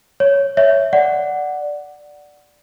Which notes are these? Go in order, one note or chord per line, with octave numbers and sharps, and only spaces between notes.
C#5
C#5 E5
D5 F#5